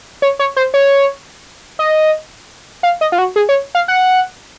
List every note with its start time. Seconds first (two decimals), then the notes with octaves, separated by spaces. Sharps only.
0.22 C#5
0.39 C#5
0.56 C5
0.74 C#5
1.79 D#5
2.83 F5
3.01 D#5
3.12 F4
3.18 F#4
3.36 G#4
3.49 C#5
3.75 F5
3.88 F#5